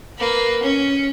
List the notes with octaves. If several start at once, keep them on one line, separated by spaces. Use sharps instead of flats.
A#3 B4
C#4